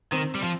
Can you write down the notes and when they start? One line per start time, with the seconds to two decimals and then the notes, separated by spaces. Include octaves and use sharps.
0.12 D#3 C4
0.35 G3
0.42 F3